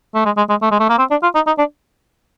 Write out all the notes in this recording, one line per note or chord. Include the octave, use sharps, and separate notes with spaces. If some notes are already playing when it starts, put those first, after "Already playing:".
A3
G#3
G#3
G#3
A3
G#3
A3
A#3
C4
D4
F4
D#4
D#4
D4